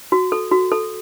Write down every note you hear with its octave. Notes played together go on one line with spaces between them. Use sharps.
F#4
A4
F#4
A4